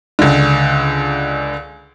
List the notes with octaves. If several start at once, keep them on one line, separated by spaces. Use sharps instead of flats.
C#2 D3